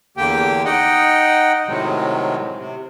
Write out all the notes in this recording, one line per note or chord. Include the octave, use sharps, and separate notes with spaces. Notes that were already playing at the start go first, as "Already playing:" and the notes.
E2 D3 A#3 G4 G5
D#4 D#5 F#5 G5
A2 C3 D#3 F#3 G#3
C3